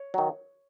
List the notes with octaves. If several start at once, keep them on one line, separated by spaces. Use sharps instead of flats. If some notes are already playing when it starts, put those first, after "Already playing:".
Already playing: C#5
D#3 F#3